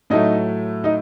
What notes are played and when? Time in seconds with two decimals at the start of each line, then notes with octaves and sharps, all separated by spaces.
0.10 A2 F#3 A3 D#4 D#5
0.84 D#4 D#5